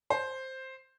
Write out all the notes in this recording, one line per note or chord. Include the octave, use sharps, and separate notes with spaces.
C5